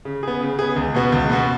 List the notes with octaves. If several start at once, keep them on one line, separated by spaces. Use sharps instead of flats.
C#3
B3 G#4
C#3
B3 G#4
C#2
B2 B3 F#4
C#2
B2 B3 F#4